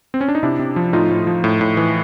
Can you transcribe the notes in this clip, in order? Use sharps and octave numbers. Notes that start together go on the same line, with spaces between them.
C4
C#4
D4
D#4
C3 D4 E4
C3
F3
A2 D#4 F4
A2
F3
A2
A2
E3